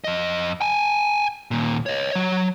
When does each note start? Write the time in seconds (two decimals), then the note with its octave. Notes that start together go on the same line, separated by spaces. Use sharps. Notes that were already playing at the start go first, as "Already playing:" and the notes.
0.04 F2 D#5
0.61 G5 G#5
1.51 D#2 A#2
1.86 C#5 D#5
2.13 F#3 C#5